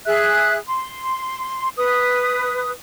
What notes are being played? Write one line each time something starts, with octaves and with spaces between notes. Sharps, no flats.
G#4 E5 F#6
C6
B4 D#6